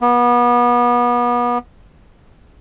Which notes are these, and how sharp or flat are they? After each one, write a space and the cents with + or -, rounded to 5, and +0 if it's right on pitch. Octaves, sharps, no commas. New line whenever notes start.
B3 -30